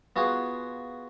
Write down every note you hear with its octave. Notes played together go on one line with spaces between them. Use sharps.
B3 F4 F#4 G#4